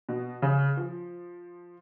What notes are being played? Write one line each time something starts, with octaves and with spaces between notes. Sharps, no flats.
B2
C#3
F3